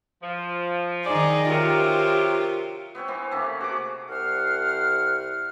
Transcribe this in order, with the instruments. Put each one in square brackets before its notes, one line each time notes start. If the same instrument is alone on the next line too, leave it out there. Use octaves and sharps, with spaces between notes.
[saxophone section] F3
[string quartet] D#3 D#4 G#4 [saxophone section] D5
[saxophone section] C3 F#3 A#4 [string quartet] F4 G4
[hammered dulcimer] B3 C4 C#5 G5
E3 B3 C4
C3 A3 A#3 C#4
F#4 G#4 D6
[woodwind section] C2 C5 F#5 F6